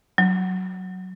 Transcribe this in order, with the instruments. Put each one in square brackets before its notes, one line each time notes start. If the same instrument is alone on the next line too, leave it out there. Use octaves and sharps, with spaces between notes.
[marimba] F#3